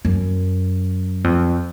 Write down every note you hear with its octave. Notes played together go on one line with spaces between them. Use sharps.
F#2
F2